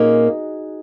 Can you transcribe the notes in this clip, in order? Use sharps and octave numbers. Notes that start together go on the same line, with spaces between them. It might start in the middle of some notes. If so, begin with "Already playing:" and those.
Already playing: A#2 A#3 C#4 D#4 F#4 G#4